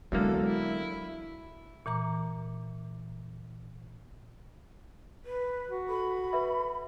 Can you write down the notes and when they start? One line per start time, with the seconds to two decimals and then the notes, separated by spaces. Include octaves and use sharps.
0.12 E2 D3 F#3 G#3 A#3 A4
0.47 E4
1.86 A#2 E3 A#5 D6
5.25 B4
5.69 F#4
5.89 A4 B5
6.33 B4 E5